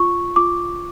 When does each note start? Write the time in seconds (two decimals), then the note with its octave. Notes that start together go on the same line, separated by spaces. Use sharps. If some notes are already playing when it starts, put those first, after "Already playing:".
Already playing: F4 C#6
0.36 F4 D6